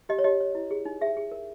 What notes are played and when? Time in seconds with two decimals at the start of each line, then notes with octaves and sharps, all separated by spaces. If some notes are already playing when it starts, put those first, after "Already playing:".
0.09 G4 D#5
0.19 C#5
0.24 G4 D#5
0.40 C#5
0.55 E4
0.71 G#4
0.85 D#4
1.01 G#4 E5
1.17 G#4
1.31 A#4